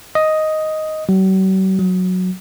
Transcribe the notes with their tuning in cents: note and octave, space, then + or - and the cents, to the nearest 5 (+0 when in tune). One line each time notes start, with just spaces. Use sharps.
D#5 +5
F#3 +45
F#3 -10